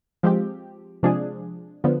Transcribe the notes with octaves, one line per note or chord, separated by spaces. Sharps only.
F3 G#3 C4 G4
C3 F3 G#3 D4 G#4
D3 F3 B3